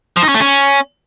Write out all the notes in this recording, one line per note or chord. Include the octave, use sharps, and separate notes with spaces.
F3
D#4
C#4
A3
C#4